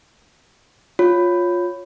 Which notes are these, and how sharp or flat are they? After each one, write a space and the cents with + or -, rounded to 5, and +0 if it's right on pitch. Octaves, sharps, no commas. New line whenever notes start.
F4 +15 C#5 +0